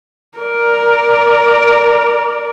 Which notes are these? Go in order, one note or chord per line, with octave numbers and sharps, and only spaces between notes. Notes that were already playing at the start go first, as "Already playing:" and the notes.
A#4 D5